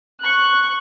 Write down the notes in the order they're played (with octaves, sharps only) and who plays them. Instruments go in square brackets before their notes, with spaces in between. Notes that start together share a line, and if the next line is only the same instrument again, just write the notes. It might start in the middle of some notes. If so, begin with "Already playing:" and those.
[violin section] C#6 F#6